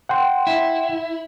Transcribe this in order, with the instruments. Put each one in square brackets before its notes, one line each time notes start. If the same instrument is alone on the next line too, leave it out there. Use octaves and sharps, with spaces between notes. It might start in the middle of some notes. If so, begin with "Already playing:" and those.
[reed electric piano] F#5 G5 C6
[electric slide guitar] E4